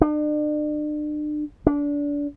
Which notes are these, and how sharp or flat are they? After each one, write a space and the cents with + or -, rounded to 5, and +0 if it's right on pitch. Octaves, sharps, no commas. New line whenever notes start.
D4 +40
D4 -25